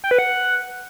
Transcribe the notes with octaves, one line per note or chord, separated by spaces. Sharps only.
G5
B4
F#5